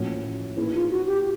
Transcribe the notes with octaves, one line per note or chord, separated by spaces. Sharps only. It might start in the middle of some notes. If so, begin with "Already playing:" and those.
Already playing: A2 F3 A#3 C#4 F#4
A#3 D#4 E4 G#4 B4
F4
F#4
G4